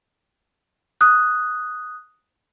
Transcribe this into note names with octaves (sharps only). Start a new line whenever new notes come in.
D#6 F#6